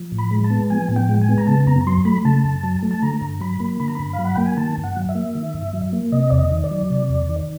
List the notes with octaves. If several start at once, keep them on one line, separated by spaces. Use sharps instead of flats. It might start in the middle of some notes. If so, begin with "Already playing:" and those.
Already playing: F3
A2
B5
G#3
A5
B3
F3 G#5
A2
G5
G#3
G#5
B3
A#5
C#3 A5
F#2 A#5
F#3 C6
A3 B5
C#3 A5
F#2
F#3
A3
A5
D3 A#5
G2
F#3 B5
A#3
D3 B5
A#5
G2 B5
F5
F#3
F#5
A#3 G5
G#5
D#3 A5
G2
F#5
F#3
E5
A#3
D#3
G2
F#3
A#3
C3 D#5
E2 D5
D#5
D#3
D5
F#3
C3
E2
D#3